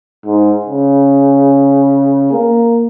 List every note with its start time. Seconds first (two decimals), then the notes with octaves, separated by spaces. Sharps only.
0.26 G#2
0.66 C#3
2.32 A#3